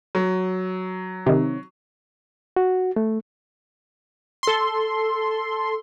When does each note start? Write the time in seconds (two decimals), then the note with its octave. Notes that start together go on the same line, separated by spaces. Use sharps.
0.15 F#3
1.26 C3 D#3
2.56 F#4
2.96 A3
4.43 A4 C6